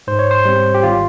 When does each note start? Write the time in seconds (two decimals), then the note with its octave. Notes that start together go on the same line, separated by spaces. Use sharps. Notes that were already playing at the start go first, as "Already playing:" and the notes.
0.07 G#2 C5
0.19 C#5
0.31 C5
0.45 G3 C4
0.74 G4
0.83 G#1 F4